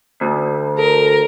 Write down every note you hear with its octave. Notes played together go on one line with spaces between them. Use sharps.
D2
A4 A#4